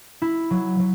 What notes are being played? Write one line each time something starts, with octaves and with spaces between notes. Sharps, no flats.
E4
F#3
F#3